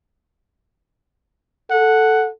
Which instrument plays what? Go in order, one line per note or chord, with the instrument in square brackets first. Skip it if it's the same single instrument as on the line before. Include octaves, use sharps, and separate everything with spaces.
[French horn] A4 [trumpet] F#5